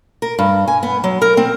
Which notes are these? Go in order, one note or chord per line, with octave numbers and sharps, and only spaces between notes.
A#4
G2
G#5
B3
F#3
A#4
C4